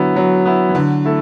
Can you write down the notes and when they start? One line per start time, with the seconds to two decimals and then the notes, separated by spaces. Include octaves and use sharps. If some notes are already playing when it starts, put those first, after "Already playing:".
Already playing: D3 F#3 B3 E4
0.16 F#3
0.46 B3 E4
0.69 E3
0.75 D3 F#3
1.05 A3 E4 A4